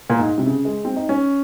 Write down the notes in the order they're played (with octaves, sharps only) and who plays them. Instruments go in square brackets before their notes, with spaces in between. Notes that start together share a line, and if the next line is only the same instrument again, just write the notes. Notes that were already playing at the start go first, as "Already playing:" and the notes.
[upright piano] A#2
G#2
C3
C#3
G#3
C4
D#4
C#4